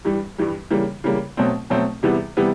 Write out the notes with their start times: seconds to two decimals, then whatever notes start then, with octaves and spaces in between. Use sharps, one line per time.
0.05 G2 E3 G3
0.38 G2 E3 G3
0.71 C#3 E3 G3 A#3
1.04 C#3 E3 G3 A#3
1.37 B2 F#3 A3 C4
1.70 B2 F#3 A3 C4
2.03 E2 C3 E3 G3 B3
2.37 C3 E3 G3 B3